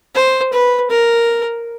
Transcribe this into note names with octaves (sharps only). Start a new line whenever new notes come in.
C5
B4
A#4